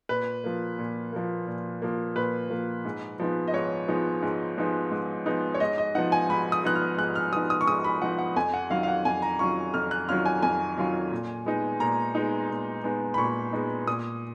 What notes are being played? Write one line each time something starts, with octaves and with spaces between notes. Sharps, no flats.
A#2 B4
F3 A#3
A#2
F3 A#3
A#2
F3 A#3
A#2 B4
F3 A#3
G#2
F3 G#3 B3 D#4
D#5
G#2 C#5
F3 G#3 B3 D#4
G#2
F3 G#3 B3 D#4
G#2
F3 G#3 B3 D#4
C#5
G#2 D#5
D#5
F3 B3 D#4 F#5
G#5
G#2 B5
D#6
F3 B3 D#4 F#6
F6
G#2 F#6
F6
F3 B3 D#4 D#6
D#6
C#6
G#2 D#6
B5
F3 B3 D#4 F#5
F#5
F2 G#5
F#5
D#3 F#3 C#4 F4 F5
F5
F#5
F2 G#5
A#5
D#3 F#3 C#4 F4 C#6
F2 F6
F#6
D#3 F#3 C#4 F4 F6
G#5
F2 G#5
D#3 F#3 C#4 F4
A#2
G#3 B3 D#4
A#2 A#5
G#3 B3 D#4
A#2
G#3 B3 D#4
B5
A#2 C#6
G#3 B3 D#4
A#2 D#6